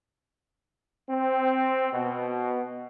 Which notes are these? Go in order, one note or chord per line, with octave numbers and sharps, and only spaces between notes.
C4
B2